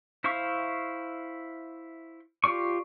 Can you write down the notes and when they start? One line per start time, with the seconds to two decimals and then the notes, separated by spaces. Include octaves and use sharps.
0.24 E4 C5 E5 F5 C#6
2.44 F4 G4 D5 C#6